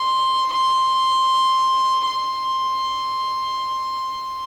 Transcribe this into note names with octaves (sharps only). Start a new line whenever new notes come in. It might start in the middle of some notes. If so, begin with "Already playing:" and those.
Already playing: C6
C6
C6